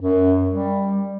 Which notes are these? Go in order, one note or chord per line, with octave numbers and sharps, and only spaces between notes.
F#2
G3